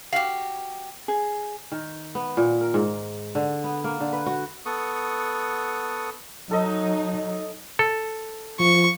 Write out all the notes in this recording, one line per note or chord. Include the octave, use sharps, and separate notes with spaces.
F#4 G4 F5
G#4
D#3
B3
A#2
A#4
G#2
D3
B3
A#3
D3
B4
F#4
B3 A4 F#5 C#6 D#6
F#3 D#4 A4 D#5
A4
F3 C#6